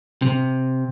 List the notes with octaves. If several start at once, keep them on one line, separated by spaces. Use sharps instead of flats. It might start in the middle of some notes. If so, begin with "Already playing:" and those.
C3